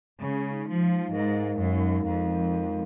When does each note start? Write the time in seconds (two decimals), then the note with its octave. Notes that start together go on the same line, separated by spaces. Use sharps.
0.21 C#3 G#3
0.51 D#4
0.67 F3
0.83 F5
1.12 G#2 A#4
1.44 G#3
1.59 F#2
1.74 D#4
2.04 F2 F5
2.35 A#4
2.66 G#3